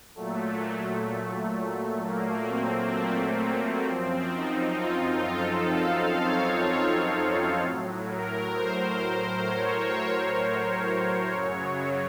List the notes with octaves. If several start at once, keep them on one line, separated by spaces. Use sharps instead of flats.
A#2 F#3 A3
A#3
C4
A3
A#3
F#2 F3 C4
D#4
F4
A4
F5
C#5
A2 F#3
A#4
C5
C5
C#5
F#2 C#3 F#3